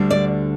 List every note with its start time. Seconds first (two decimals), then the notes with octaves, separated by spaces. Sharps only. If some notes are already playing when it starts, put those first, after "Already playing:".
Already playing: D2 D3 G3
0.10 D5